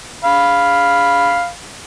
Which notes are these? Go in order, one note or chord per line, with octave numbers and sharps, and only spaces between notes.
F5 B5